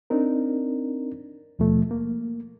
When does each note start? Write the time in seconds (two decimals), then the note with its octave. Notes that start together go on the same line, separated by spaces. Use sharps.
0.10 C4 D4 D#4 A#4
1.59 D#2 B2 F3 A3
1.91 A#3